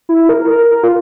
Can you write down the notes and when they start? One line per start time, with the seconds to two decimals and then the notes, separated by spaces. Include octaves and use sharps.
0.09 E4
0.29 A#4
0.50 A#4
0.71 A#4
0.83 F4